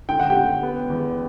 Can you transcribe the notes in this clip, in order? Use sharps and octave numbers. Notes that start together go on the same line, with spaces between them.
D3 G5
F#5
G4 G5
D3
B3
E2